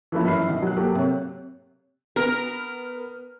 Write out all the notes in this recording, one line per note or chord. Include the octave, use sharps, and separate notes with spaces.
E3 F3 A3 A#3 C#4 E4
F#2 E3 E5 B5 F6 C7
B2 D#3
F#3 F#6
F#3 A#3 G4 A4
C3 C#5
B3 A#4